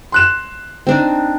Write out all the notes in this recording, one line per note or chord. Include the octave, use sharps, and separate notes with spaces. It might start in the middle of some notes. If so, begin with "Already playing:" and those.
C6 F#6 E7
C4 D4 D#4